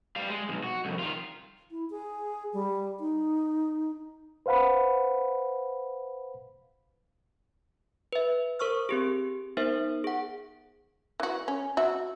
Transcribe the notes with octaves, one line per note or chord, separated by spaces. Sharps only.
G3 F5
G#3
B1 E2
F#4
C2 F2
D#3 F4
E4
G#4
G3
D#4
B4 C5 F5 F#5 B5
B4 E5
A#4 C5 C#6 E6 F6
C4 G4 G#4
B3 D#4 A#4 C5 E5
G#4 F#5
E3 F#4
C#4
F#4 E5